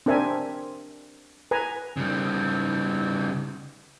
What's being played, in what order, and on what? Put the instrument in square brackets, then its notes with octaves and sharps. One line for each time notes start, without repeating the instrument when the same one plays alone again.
[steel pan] C4 D4 A#4 E5 G#5
B4 G#5 A#5
[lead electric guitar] C#3 G3